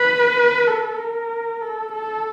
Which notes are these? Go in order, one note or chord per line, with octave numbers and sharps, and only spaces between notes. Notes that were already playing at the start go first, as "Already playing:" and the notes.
Already playing: B4
A4
A#4
A4
A4